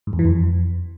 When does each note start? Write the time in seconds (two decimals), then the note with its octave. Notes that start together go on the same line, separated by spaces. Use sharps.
0.07 G#2
0.13 E2
0.19 E3
0.25 F2